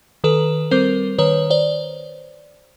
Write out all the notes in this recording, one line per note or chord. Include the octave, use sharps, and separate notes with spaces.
D#3 A4 B4
G3 C4 A#4 C5
D#3 B4 C#5
C5 D5